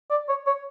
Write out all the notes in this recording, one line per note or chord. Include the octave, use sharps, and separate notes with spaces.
D5
C#5
C#5